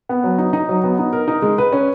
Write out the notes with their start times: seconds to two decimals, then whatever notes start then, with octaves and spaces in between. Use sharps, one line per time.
0.09 B3
0.24 F#3
0.38 D#4
0.53 D#4
0.69 F#3
0.84 B3
0.99 D#4
1.13 A#4
1.28 D#4
1.42 G#3
1.58 B4
1.72 C#4